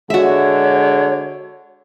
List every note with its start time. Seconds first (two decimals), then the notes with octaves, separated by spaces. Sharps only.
0.10 D3 G#3 F#4 C#5 E5